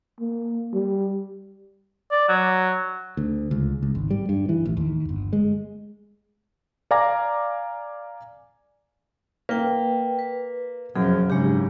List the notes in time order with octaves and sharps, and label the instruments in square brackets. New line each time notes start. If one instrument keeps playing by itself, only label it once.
[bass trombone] A#3
G3
[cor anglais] D5
F#3
[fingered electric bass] D2
C#2
C#2
G#1
G3
G2
E3
A1
D#2
G1
G#3
[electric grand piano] D5 F5 G#5 A#5 D6 A#6
[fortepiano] A#3 [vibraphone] B4 G5
[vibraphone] B4
[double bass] F1 F3 [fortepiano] F#2 [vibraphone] G#4
[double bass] G#2 C#3 [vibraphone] G#3 D4 G4